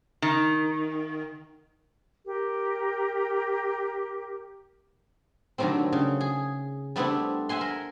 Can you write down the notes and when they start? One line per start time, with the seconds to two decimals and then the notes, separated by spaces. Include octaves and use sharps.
0.22 D#3
2.26 G4 A#4
5.58 D3 D#3 F#3 G3 A3 C4
5.92 C#3
6.21 G#4
6.96 G3 A3 B3 C4 D4 E4
7.49 E5 F#5 G#5 C6
7.61 A#4